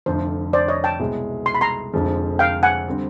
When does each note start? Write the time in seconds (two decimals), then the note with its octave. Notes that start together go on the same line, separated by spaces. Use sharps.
0.06 F1 F2 D3 F3 C5
0.53 C5 D5
0.68 C#5 D#5
0.84 G5 A5
1.00 C2 B2 G#3
1.46 C6
1.55 B5
1.61 A#5 C6
1.93 F1 F2 D3 F3 G#3
2.39 F5 G5
2.63 F#5 G#5
2.88 D3 G3 C4